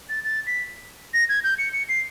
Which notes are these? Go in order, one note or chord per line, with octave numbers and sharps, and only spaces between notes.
A6
A6
B6
A#6
G#6
G6
C#7
C#7
C7